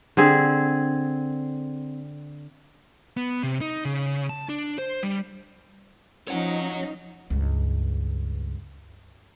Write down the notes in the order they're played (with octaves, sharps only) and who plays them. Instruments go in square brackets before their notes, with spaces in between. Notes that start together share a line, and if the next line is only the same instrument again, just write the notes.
[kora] D3 C4 G#4
[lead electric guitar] B3
C3
D#4
C#3
A5
D4
C5
G3
[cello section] F3 C#4 D#4 [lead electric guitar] C#5 F#5
[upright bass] C#2 G2